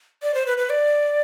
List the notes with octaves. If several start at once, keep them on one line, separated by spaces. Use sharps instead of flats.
D5
C5
B4
B4
D5